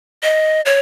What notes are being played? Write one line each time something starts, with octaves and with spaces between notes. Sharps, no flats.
D#5
C#5